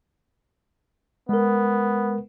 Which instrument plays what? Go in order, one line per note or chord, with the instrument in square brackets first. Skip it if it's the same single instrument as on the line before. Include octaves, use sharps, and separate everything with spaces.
[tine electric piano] G#3 A#4 [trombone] B3